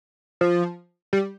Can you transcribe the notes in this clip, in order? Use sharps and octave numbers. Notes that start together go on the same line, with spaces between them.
F3
G3